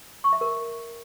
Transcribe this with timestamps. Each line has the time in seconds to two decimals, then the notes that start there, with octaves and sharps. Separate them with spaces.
0.24 C#6
0.33 E5
0.41 A#4